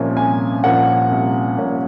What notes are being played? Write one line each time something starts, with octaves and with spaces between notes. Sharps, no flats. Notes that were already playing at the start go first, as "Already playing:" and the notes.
Already playing: C2 A#2 F3 A#3 C#4
C2 G#5
A#2 F3 A#3 C#4 F#5
C2
A#2 F3 A#3 C#4